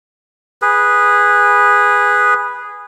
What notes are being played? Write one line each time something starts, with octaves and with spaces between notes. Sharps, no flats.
G#4 B4